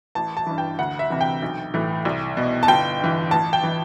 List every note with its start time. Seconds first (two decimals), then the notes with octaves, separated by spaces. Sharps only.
0.15 A1 A5
0.37 A5
0.47 G2 E3
0.58 G5
0.79 D2 F#5
0.99 E5
1.10 C3 E3
1.21 G5
1.42 B1
1.74 A2 E3
2.05 C2
2.37 B2
2.63 A5
2.68 G1 G5
3.00 G2 E3
3.31 A1 A5
3.53 G5
3.63 E3